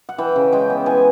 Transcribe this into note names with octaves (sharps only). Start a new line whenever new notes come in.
F#5
E3 G5
C#3
G#3 G5
B3
E3 G#5